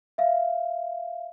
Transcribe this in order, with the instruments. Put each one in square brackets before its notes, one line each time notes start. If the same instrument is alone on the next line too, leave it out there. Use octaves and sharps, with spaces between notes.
[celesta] E5 F5